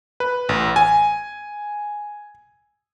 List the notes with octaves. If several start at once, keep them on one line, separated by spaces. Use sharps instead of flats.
B4
A1
G#5